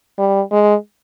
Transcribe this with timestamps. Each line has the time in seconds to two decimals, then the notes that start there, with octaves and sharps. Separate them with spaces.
0.19 G3
0.52 G#3